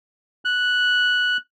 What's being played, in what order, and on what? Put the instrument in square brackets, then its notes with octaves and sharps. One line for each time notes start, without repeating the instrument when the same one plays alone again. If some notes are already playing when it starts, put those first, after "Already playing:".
[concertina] F#6